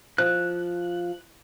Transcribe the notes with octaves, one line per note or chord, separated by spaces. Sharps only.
F3 F#6